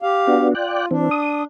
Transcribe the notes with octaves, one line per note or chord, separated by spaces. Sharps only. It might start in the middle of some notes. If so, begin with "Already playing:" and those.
G4 F5
B3 D4 F#4
F4 D5 G5 F#6
E3 C4 D4
D#6